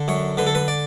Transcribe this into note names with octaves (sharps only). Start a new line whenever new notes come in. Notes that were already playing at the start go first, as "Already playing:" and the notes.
Already playing: D3
F#2 C#5
D3 B4
A4
B4
D5